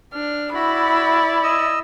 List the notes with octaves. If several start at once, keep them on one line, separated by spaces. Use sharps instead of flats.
D4 F6
E4 F#4 D5 B5
D#5 E6